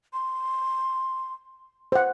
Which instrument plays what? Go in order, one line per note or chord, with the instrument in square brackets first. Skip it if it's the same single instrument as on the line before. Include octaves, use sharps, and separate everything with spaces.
[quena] C6
[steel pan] C5 F#5